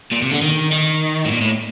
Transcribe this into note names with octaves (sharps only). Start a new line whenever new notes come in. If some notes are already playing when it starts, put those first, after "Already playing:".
A#2
C3
D3
D#3
D#3
A2
A#2
A2